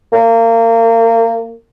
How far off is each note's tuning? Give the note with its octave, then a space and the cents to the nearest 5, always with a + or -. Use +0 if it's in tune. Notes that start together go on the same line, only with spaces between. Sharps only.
A#3 -30